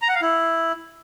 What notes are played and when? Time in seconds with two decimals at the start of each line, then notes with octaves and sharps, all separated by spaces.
0.02 A#5
0.08 F#5
0.15 F5
0.22 E4